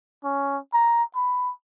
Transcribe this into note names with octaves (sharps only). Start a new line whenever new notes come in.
C#4
A#5
B5